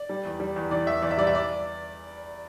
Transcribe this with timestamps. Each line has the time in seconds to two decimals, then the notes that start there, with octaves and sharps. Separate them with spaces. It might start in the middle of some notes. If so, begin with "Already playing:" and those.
Already playing: D5
0.09 G3
0.25 E2
0.40 G3
0.56 E2
0.71 E3 D5
0.87 E2 E5
1.03 E2 D5
1.11 E5
1.18 G3 D5
1.27 E5
1.35 D5